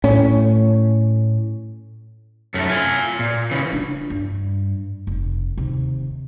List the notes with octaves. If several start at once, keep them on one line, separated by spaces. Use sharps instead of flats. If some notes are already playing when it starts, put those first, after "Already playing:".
A2 C#4
F#2 A3
F4 G#5
A#2
C#3 E3
D4 F4
G2
F1
D#2 C3